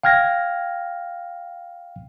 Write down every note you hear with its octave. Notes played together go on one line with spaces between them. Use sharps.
F5 G5 F6 G#6 A#6